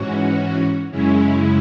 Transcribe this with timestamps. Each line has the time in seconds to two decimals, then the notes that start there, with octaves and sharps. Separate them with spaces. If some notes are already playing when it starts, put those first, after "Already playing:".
Already playing: G#2 E3 C#4 F#4
0.91 F#2 C#3 G#3 C#4 E4